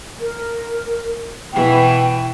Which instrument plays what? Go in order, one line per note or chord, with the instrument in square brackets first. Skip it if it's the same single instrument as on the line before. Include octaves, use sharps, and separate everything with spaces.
[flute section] A#4
[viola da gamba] B2 E3 [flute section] G5